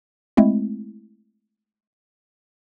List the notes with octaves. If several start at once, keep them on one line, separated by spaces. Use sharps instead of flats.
G#3 A3 C4 E4